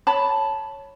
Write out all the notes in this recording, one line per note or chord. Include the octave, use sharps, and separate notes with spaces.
C#5 A5 B5